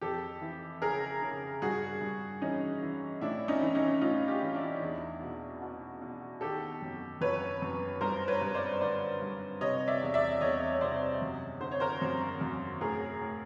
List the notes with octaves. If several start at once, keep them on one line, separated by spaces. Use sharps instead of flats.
F2 G4 A4
E3
C#3 G#4 A#4
C#3
G2 F#4 G#4
G2
E3 C#4 D#4
E3
A2 D4 E4
C#4 D#4
E3
C#4 D#4
A2 D#4 F4
F4 G4
E3
D4 E4
E2
B2
B2
B2
D#3 G4 A4
F#2
F#2 B4 C#5
F#2
G2 A#4 C5
B4 C#5
G2
C5 D5
D3 C5 D5
G2
C3 C#5 D#5
D5 E5
E2
D5 E5
E2 C#5 D#5
C#5
C3 C5 D5
F#2
D3 C5
C#5
A#4 C5
F#2
F#2
A2 G#4 A#4
A2